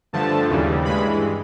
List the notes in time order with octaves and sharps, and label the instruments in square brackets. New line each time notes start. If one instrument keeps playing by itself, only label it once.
[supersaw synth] G2 D3 F3 A3 A5
D#2 C#3 E3 G3
G2 E3 G#3 B5